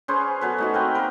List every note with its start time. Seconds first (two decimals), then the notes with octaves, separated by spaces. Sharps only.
0.08 C#4 G#4 B4 C5
0.41 F#3 B3 A4 B4
0.58 A3 D#4 F#4
0.73 C4 A#4 B4 G5
0.95 A#3 A#4 B4